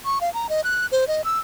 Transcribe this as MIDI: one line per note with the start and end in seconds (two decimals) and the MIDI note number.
0.05 0.19 85
0.21 0.32 77
0.34 0.47 82
0.49 0.61 75
0.64 0.86 90
0.92 1.07 72
1.08 1.22 75
1.25 1.39 88